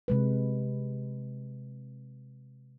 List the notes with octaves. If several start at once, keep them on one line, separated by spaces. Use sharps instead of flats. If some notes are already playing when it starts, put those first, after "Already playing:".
C3 G#3 B4